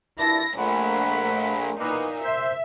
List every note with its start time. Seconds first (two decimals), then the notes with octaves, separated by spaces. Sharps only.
0.19 G2 A#2 E4 A5 A#6
0.58 A#1 A3 F#5 B5
1.80 A#2 E3 A#3 B3 D#4
2.24 C5 E5